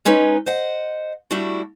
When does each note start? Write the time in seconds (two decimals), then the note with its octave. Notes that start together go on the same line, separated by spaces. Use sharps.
0.05 G#3 C#4 D#4 B4 C#5
0.46 C5 D#5 F#5
1.31 G3 A3 D4 E4 F#4